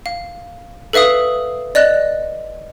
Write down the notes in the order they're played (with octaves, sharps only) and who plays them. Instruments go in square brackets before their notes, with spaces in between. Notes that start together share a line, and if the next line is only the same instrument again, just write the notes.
[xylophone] F5
A4 B4 E5 F5 D#6
D5 D#5 F#6